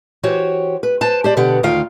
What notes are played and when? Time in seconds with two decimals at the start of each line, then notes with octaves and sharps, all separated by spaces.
0.23 E3 F#4 G4 C5 C#5
0.83 B4
1.01 B4 C5 A5
1.24 G4 C5 D5
1.37 B2 D3 G4 B4 F#5
1.63 D2 D#3 D#4 F4 F5 G5